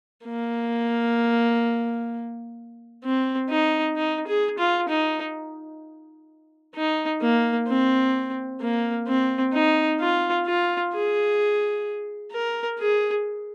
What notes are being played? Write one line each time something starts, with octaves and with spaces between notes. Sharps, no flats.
A#3
C4
D#4
D#4
G#4
F4
D#4
D#4
A#3
C4
A#3
C4
D#4
F4
F4
G#4
A#4
G#4